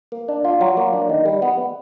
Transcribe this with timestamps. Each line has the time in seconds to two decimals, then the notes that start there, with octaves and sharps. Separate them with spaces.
0.12 A#3
0.28 D4
0.44 F4
0.61 F#3
0.77 A#3
0.93 D4
1.09 D#3
1.26 G3
1.42 B3